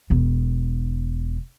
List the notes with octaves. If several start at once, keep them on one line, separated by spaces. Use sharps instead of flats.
E1 B3